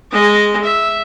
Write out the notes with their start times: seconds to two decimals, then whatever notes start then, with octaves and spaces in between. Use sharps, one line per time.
0.12 G#3 D#5
0.64 E5